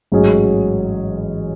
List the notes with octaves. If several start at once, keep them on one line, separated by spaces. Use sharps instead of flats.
A1 G#2 F#3 C#4 G#4